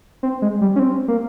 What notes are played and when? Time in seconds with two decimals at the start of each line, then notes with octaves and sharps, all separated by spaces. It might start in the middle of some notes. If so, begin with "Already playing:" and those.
0.23 C4
0.42 G#3
0.61 G3
0.76 C#4
0.79 C4
1.08 A#3